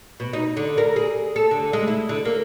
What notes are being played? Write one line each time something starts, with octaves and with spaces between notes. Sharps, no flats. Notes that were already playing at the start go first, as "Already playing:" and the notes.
B2
D#4
D3
A#4
G#4
A4
D3
G#3
E4
D3
A#3